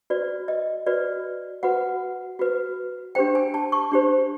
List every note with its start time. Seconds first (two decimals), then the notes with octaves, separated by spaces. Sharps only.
0.10 F#4 B4 D5
0.48 D#5
0.86 F#4 B4 D5
1.63 F#4 B4 F#5
2.39 F#4 B4
3.15 D4 G4 C5 G5
3.35 G#5
3.54 A5
3.72 C#6
3.92 D4 G4 C5